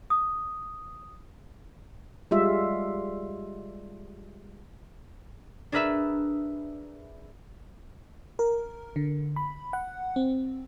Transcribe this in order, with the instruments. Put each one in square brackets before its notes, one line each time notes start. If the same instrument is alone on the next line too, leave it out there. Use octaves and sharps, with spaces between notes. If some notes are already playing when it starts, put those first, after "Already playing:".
[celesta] D#6
[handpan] G3 G#3 F4 E5
[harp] D4 G#4 A#4 B4 E5
[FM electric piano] A#4
D3
B5
F#5
C4